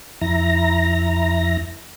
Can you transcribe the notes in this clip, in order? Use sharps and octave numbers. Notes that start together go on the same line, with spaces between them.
F2 E4 A#5 A#6